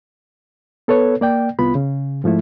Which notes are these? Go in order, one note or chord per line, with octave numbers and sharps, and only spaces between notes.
B3 A4 B4 C#5
A#3 D5 G5
C2 B3 F4 B5
C#3
G#2 F3 A3 E4